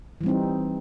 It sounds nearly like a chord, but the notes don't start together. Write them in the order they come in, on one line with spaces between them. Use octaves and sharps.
E3 G3 C4 D#4